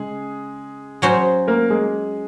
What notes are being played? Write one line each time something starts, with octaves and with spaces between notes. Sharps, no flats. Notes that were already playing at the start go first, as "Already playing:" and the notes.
Already playing: C#3 G#3 G#4
F#3 C#4 F#4 C5
A#3 A#4
G#3 G#4